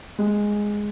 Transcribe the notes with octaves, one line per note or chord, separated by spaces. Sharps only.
G#3